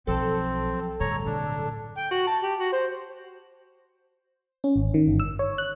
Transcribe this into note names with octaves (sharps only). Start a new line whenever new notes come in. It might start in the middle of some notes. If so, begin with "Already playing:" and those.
B1 F3 F#3 C4 A4
D1 G2 G3 C#5 A#5
B2 D4
G5
F#4
A5
G4
F#4
C5
C#4
G#1
D#3
G1
E6
C#5
F#6